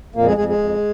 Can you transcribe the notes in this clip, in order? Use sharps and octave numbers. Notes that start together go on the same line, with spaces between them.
F2 A#2 A#3
G#3 G#4
F2 G#3 G#4
G#3 G#4
F2